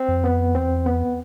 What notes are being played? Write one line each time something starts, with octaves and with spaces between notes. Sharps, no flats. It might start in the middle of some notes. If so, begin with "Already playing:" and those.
Already playing: C4
F2
B3
E2 C4
B3